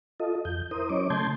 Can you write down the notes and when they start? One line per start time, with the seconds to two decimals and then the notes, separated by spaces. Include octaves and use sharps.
0.20 F4 A4 D#5
0.45 F2 G6
0.71 E4 A#4 C5 D#6
0.90 F#3 C#4 C#5 D#5 D6
1.10 C#3 A3 A5 C6 G6 G#6